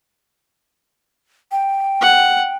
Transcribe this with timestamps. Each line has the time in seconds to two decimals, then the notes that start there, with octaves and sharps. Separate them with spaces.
1.51 G5
2.01 F#5